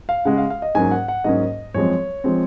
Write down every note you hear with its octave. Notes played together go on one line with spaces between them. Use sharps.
F5
C#3 G#3 C#4 F#5
F5
F5
D#5
G#2 F#3 A#3 C#4 G#5
F#5
F#5
G#2 F#3 A#3 C#4 D#5
F#2 F3 G#3 C4 C#5
F3 G#3 C4